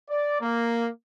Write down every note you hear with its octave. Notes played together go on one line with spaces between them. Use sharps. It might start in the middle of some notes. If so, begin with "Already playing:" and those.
D5
A#3